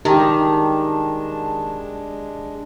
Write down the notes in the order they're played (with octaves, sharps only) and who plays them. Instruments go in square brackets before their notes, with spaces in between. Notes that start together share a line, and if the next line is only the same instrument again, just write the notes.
[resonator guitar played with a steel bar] D#3 [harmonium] G#3 D4 [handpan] G4 [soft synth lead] A5